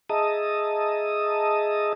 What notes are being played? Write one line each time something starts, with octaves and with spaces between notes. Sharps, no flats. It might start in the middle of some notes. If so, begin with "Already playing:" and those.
G#4 D#5 E5 A5 A#5 D#6